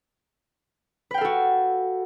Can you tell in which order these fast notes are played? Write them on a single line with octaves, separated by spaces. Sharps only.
B4 G5 F5 A4 F#4